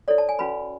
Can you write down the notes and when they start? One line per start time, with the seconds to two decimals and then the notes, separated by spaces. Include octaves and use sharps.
0.08 E4 A4 C#5 D5
0.18 A5
0.29 G#5
0.39 C#4 F#4 B4 B5